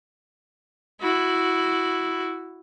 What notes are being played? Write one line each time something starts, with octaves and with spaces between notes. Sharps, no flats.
E4 F#4